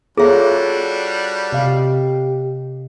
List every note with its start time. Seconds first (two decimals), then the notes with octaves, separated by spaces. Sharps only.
0.17 G3 D4 F4 F#4 G#4 A4 C#5 E5
1.53 C3 G4 D#5 F5